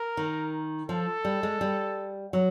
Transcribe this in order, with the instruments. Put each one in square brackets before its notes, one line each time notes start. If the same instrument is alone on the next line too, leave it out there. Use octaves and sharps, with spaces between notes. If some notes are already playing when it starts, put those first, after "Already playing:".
Already playing: [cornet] A#4
[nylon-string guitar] D#3
[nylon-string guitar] F3 [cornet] A4
[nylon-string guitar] G3
G#3
G3
F#3